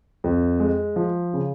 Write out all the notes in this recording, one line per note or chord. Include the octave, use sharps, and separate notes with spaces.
F2
G#3
F3
C#3